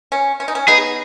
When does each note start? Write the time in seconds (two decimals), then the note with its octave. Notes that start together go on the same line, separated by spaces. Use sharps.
0.12 C#4
0.40 C#4
0.48 D#4
0.55 C#4
0.68 B3 D#4 G#4